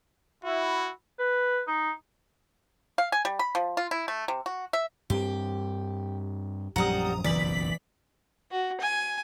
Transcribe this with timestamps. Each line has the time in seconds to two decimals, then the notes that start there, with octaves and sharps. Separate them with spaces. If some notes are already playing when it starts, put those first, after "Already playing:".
0.44 E4 F#4
1.19 B4
1.67 D#4
2.98 F5
3.12 G#5
3.25 G3
3.39 B5
3.55 F3
3.77 F4
3.91 E4
4.08 A3
4.28 C3
4.46 F#4
4.73 E5
5.10 G2 C4 G4
6.76 A#1 F#2 F3 G3 F#5 A#5 D#6
7.24 F#1 B1 F2 E3 D5 B6 F#7
8.51 F#4
8.81 G#5